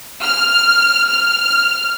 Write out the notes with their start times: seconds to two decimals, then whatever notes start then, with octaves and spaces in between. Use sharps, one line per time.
0.22 F6
1.06 F6